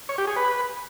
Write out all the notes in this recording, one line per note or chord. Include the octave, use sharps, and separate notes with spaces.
C#5
G4
G#4
B4